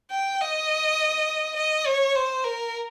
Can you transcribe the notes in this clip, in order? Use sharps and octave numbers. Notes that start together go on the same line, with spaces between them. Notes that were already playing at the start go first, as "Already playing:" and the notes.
G5
D#5
D#5
C#5
C5
A#4